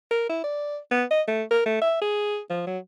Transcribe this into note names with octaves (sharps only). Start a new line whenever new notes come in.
A#4
E4
D5
B3
D#5
A3
A#4
A3
E5
G#4
F3
F#3